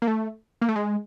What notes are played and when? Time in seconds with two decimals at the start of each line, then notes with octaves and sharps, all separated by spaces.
0.02 A#3
0.07 A3
0.62 A#3
0.69 A3
0.76 G#3